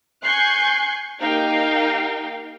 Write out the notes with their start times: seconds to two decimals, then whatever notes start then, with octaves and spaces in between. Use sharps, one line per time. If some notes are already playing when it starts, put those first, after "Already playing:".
0.22 G#5 C#6 F#6 G6 C7
1.21 A#3 D#4 G4 F5 G5